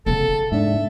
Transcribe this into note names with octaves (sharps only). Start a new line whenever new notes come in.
C#3 B3 A4
G#2 D4 E5